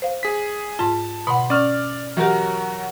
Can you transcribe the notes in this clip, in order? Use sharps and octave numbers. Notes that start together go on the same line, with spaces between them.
C5 F5
G#4 B6
G#2 F4 A5
B2 D3 F#5 B5 C6
C#4 D5 F6
E3 F#3 F#4 G4 A#4